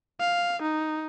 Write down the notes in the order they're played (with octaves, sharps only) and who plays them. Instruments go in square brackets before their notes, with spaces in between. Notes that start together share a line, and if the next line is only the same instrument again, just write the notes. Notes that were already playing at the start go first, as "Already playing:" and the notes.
[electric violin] F5
D#4